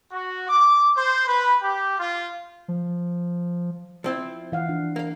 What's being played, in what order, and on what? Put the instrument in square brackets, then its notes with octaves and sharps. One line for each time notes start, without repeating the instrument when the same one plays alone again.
[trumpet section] F#4
D6
C5
B4
G4
F4
[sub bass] F3
[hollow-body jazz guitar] F3 C4 E4
[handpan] E3 F5 F#5
D4 F4
[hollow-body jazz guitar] A#3 F5